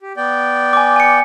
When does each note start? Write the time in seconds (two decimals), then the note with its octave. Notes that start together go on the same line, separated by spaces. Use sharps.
0.01 G4
0.17 B3 D5 G5
0.73 G#5 D6
0.96 G#5 C#7